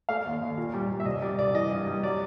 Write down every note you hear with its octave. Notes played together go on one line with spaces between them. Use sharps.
A3 F5
D#2
D#2
A#2
G3
G3
E5
C2 D#5
G3 D5
C2 D5
E3 D#5
G2
G3
F#3 D5